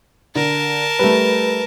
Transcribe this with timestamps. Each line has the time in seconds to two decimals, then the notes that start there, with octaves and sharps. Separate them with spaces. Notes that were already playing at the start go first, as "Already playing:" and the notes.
0.35 D3 A#4 A5
0.99 G3 A3 B4